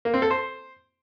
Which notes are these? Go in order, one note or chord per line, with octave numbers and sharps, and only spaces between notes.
A#3
C4
A4
C5